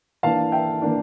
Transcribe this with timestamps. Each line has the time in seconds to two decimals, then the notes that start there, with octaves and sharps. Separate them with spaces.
0.23 E3 A#3 D4 F5 A5
0.52 E5 G5
0.82 E3 A#3 D4